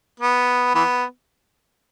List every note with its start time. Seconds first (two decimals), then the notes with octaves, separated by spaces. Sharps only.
0.20 B3
0.75 E3 B3